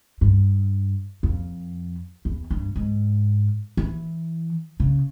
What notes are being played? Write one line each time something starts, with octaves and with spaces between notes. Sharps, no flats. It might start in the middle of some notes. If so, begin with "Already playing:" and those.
G2
F2
E2
G2
G#2
E3
C#3